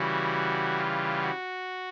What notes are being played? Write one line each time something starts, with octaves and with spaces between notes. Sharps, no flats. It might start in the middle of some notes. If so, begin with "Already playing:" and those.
Already playing: C#3 E3 G3 F#4
F4
F#4